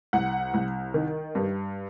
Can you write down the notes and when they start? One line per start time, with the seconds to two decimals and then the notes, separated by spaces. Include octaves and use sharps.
0.13 C2 F#5
0.54 C2
0.94 D#3
1.35 G2